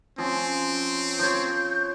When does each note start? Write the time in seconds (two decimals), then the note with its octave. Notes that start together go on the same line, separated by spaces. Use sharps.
0.18 F3 C4 C#4
1.19 F3 C#5 G6